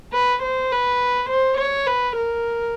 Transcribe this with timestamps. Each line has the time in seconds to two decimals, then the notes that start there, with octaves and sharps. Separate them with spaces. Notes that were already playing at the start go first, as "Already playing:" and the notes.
0.13 B4
0.43 C5
0.72 B4
1.30 C5
1.58 C#5
1.87 B4
2.17 A#4